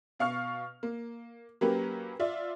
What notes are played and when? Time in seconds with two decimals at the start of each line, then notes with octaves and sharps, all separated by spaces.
0.19 B2 F5 C#6 F6
0.83 A#3
1.61 F#3 A#3 C#4 G4 A#4 B4
2.19 F4 D5 E5